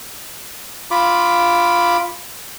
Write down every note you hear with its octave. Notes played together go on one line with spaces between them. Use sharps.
F4 B5 D6